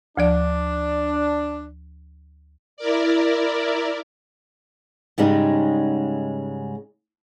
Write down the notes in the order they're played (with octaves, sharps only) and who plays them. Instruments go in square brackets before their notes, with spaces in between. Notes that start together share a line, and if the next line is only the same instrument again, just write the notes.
[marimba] D2 F3 D5 [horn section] D4
[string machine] E4 A#4 D5
[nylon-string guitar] G#2 C#3 G3 G#3 D#4